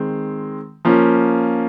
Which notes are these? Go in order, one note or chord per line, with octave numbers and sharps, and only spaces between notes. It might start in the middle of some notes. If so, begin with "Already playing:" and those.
Already playing: D#3 G#3 C4
F3 A#3 C#4